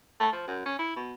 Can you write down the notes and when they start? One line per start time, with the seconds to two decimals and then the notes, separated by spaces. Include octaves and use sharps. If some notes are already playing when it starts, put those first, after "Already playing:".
0.20 A3
0.33 F3
0.48 F#2
0.66 C#4
0.79 E4
0.96 B2